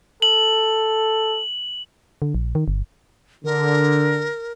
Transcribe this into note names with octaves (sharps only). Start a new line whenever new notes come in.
A4 F#7
D3
A#1
D#3
G1
D3 A#4